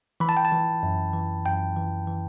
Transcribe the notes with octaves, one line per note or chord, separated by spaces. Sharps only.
E3 B5
A5
G5
A5
E3
F#2
E3
F#2 G5
E3
E3